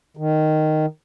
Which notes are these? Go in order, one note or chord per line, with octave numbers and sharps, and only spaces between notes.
D#3